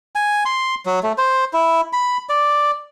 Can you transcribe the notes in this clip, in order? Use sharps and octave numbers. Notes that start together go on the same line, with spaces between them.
G#5
C6
F#3
A3
C5
E4
B5
D5